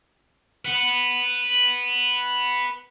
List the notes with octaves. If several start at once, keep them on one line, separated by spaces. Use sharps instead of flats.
B4 F#5